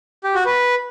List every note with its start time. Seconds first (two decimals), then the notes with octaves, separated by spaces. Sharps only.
0.24 G4
0.35 F#4
0.46 B4